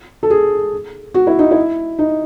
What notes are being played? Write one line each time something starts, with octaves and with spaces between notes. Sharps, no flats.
A4
G#4
F#4
E4
D#4
E4
D#4